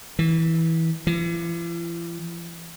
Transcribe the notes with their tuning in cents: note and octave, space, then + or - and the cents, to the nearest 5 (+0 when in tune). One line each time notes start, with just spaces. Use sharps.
E3 -15
E3 +45